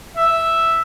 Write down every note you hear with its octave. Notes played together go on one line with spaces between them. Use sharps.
E5